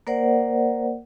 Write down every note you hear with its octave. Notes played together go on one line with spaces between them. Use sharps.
A#3 A#4 C5 D5 F#5